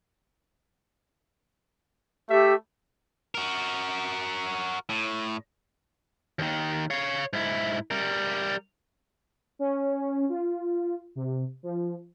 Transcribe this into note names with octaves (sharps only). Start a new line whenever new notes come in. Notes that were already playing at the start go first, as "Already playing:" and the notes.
A3 G4 E5
F#4 A#4
A2
D#2 D#3
C#5 F5
G#2 E4
G3 A#4
C#4
F4
C3
F3